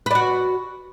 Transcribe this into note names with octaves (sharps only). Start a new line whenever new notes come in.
F#4 B4 D5